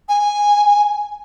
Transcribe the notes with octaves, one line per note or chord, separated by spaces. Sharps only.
G#5